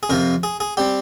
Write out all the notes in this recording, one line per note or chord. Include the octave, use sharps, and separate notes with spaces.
G#4
F2 C3 F3 A#4
G#4
G#4
G3 C4 G4